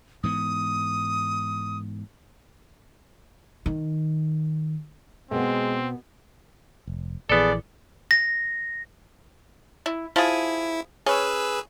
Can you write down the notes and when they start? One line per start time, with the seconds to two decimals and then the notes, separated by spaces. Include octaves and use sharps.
0.23 G#2 E3 B3 D#6
3.66 D#3
5.31 B2 G#3 B3 C4
6.87 F1
7.29 A#1 E3 B3 G#4 A4 D5
8.11 A#6
9.86 E4
10.16 F3 E4 G#4
11.06 C#4 G#4 B4 E6